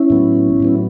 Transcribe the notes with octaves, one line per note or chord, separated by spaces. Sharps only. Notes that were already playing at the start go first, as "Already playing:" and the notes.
Already playing: C#4 E4
A2 F#3 B3
A2 F#3 B3